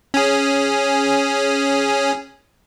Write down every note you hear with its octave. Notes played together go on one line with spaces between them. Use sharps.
C#4 G#4